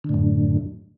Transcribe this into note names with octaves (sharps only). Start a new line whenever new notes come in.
F#2 A2 D3